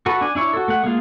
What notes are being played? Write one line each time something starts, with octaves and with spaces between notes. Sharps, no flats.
F#4 A4 B4
D4 G#5
D4 E4 C#5
F#4 A4
A3 F#5
G#3 A#3 F4